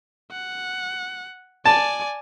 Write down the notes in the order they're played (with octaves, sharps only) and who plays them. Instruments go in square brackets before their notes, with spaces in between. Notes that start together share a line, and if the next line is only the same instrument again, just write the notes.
[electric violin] F#5
[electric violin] D5 G#5 [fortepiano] A5